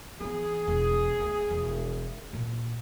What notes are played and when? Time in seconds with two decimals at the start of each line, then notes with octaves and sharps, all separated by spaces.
0.21 E3 B3 G#4
0.67 E1
1.20 D2
1.51 E1
2.33 A#2